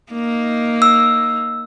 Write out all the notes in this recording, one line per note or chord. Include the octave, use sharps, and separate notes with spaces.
A#3 D#4
E6